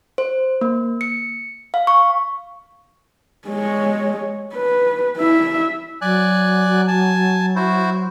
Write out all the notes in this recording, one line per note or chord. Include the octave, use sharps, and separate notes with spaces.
C5
A#3
C#7
F5
C#6
G#3 C#5
B4
E4 E5
F#3 D5 G#5 F#6
G#5 A5
E4 F#4 C5